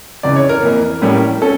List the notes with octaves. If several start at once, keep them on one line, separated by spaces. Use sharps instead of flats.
C#2 C#3 E3 D5
C#5
A#4
F2 E3 A#3
A2 G3 A#3 C#4
C#4 A4